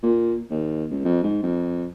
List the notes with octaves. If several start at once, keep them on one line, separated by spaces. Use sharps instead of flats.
A#2
D#2
C#2
F2
G#2
F2